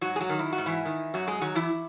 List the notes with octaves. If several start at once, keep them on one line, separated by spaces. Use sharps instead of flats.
G#2 F#3 F#4
G#4
F#3 F#4
D#3
E4
F#4
G#2
E3 E4
D#3
F#2 F#3 F#4
G#3 G#4
D#3 F#3 F#4
E3 E4